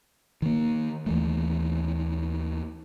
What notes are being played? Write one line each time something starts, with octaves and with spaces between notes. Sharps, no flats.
D#3 A#3
D#2 E3 A3